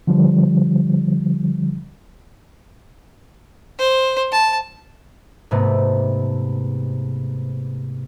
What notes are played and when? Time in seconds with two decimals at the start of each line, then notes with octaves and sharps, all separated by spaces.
0.07 D3 F3 G3
3.79 C5
4.32 A5
5.51 G#2 C3 A3 B3